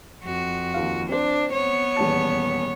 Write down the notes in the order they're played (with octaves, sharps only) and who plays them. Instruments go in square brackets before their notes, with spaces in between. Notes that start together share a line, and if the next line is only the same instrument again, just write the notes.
[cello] F2 F#4
[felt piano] D#2 F4 F5
[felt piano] C4 C5 [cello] D4
[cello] B3 C#5
[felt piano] D#1 E2 A5